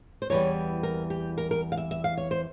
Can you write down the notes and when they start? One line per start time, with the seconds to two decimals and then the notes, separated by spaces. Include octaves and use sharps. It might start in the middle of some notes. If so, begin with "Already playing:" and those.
0.22 C5
0.30 E2 E3 G3 C#5
0.83 A#4
1.10 G4
1.38 A#4
1.51 A#4
1.72 F5
1.78 E5
1.91 E5
2.04 F5
2.17 C#5
2.31 C5